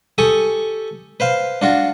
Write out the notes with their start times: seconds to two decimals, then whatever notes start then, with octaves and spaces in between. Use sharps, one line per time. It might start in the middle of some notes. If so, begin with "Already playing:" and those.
0.18 G4 A4 G#5 C#6 D#6
1.20 B4 C5 F5
1.62 D4 F4 F#4